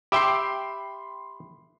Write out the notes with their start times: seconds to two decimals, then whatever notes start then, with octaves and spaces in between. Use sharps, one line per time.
0.12 G4 E5 G5 B5 C6 C7